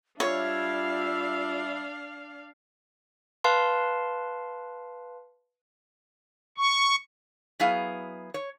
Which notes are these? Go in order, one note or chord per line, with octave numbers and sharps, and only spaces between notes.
G3 D4 F4 C#5 E5 F5
B4 F5 A5 C6
C#6
F#3 B3 E4 G#4 F5
C#5